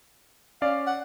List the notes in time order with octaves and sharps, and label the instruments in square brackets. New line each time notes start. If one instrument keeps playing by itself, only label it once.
[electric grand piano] C#4 D5 [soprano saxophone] F5
[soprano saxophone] F#5